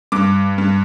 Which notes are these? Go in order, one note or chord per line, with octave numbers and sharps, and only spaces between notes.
G2 D6
G2